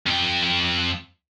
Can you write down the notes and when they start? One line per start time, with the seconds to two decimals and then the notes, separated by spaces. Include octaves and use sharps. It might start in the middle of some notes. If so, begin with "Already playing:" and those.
0.07 F2 G5